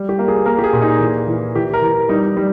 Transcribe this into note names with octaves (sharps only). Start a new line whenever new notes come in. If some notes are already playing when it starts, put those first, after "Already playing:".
Already playing: G3
G4
A#3
G#4
A#3 A#4
G4
G#4
A#2
D#4
E3
E3
E3 G4
A#4
E3
G3 D#4
G3